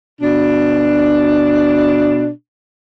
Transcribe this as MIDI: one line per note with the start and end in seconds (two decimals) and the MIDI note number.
0.22 2.29 47
0.22 2.29 62